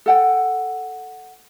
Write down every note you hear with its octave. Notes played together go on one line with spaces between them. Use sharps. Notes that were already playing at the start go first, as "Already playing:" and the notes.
A4 F#5 G5